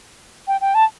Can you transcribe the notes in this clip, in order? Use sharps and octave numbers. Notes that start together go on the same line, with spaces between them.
G5
G5
A5